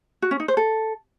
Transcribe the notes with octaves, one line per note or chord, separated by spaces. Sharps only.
F#4
C#4
D#4
C5
A4